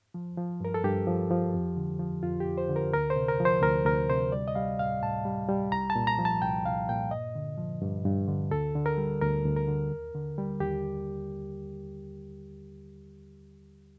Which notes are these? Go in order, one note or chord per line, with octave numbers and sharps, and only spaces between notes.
F3
F3
G2 A#4
A4
G2 G4
F3
F3
F2
D3
F3
F2 F4
G4
F2
C5
D3
A#4
D2 A#4
C5
C3
A#4
F3
C5
D2 A#4
D2 A#4
C3 C5
G3 D5
D#5
G3 F5
A2 F5
A2 A5
G3
G3
C2 A#5
A5
A#2
A#5
F3
A5
C2 G5
C2 F5
A#2 G5
G2 D#5
D3
F3
G2
G2
D3
D2 A4
D3
A#4
G3
D2 A#4
D2
A#4
D3
D#2
D3
G3
D#2 G4